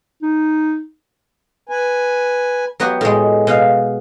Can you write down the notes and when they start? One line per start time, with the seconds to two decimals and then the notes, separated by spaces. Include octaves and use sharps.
0.22 D#4
1.69 B4 G#5
2.80 F#3 B3 F#4 G4
3.01 A2 G#3
3.47 B2 F5